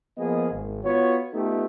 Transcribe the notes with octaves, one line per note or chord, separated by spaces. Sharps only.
F3 A#3 B3 G#4 D#5
G#1
B3 F4 F#4 C#5
A3 B3 D#4 F4 G4 A4